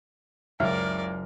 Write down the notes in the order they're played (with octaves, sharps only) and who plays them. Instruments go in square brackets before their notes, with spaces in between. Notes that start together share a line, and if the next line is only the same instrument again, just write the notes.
[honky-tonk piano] F#1 F6 [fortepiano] C#2 [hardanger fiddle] A#4 D5 [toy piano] E5